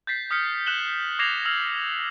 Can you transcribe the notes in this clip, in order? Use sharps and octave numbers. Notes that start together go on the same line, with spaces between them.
G6 A6 B6 C7
D#6 F6 B6 C#7
F#6 E7 F#7 G7
D6 G#6 A#6 C7 E7 F7
E6 F6 A#6 F7 F#7